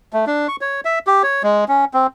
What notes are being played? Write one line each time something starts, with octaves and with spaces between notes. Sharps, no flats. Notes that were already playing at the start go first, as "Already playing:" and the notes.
A3
D4
C#6
C#5
E5
G4
C#5
G#3
C#4
C4